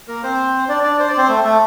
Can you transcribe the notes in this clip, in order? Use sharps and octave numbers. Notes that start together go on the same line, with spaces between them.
A#3 A#4
C4 C5
D4 D5
D4 D5
C5
D5
C4 C5
A3 A4
A3 A4